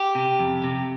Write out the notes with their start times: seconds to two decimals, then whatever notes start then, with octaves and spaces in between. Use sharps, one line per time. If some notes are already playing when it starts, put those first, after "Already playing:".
Already playing: G4
0.15 C3
0.39 F2
0.64 C3